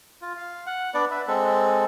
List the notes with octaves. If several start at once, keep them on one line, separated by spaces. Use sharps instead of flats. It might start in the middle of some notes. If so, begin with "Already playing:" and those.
F4
F5
F#5
B3 D4 D5
B4 E5
G#3 C4 A4